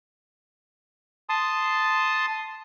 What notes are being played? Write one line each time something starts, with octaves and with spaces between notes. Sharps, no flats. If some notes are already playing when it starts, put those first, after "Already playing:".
A5 C6 D#6